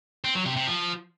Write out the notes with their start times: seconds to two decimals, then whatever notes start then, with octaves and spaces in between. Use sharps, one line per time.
0.25 C4
0.35 F#3
0.46 C3
0.56 C3
0.67 F3